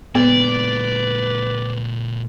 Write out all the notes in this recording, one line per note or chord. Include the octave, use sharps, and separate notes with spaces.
A#2 G#3 B3 B4 D5